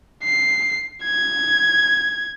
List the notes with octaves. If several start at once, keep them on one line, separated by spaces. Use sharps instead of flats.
C7
G#6